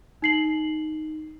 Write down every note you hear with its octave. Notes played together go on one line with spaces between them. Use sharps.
D#4 C7 F#7